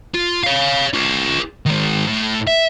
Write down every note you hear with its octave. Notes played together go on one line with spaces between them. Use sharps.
F4
C#5 F5
F4 G#4
D#3 G#3
A2
E5